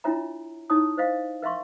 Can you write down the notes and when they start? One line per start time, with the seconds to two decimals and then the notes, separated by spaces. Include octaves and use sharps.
0.04 D4 E4 F4 C#5 E5 A#5
0.70 D#4 E4 C#5 A5 D#6
0.97 C5 D#5 F5
1.42 A#4 E5 F5 C6 C#6